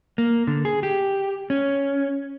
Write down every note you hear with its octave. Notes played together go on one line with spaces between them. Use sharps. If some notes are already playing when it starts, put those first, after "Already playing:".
A#3
D3
G#4
G4
C#4